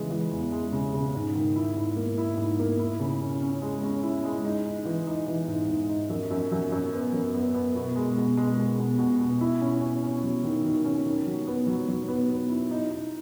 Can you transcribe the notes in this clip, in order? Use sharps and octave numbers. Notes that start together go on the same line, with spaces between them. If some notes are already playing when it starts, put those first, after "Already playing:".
Already playing: C#3 E3 G#3
E3
E2
G#3
C#3
C#3
G#2
D#3
E4
G#2
A#3
E4
G#2
A#3
E4
C#3
C#4
C#4
G#3
C#4
E4
G#3
D#4
D#4
E3
D#4
E3
G#2
G#2
D#4
F#2
F#2
F#2
F#2
B3
F#2
B3
B3
B2
G#3
B2
G#3
G#3
B2
B2
B2
E4
C#4
C#4
C#4
F#3
D#3
D#3
C#4
D#3
F#3
B3
F#3
F#3
B3
B3
E4
D#4
D#4